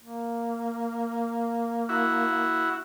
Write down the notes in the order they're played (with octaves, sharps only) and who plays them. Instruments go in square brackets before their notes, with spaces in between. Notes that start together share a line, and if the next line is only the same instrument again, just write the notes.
[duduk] A#3
[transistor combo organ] E4 F#4